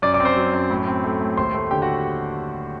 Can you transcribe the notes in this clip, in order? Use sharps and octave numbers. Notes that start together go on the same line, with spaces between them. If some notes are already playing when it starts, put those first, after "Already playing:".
F#2 D5 D6
D5 D6
C4
C5 C6
F#3
F#2
A2
C4
A3
A2
D#2 C5 C6
A3
D3 G4 G5
F#4 F#5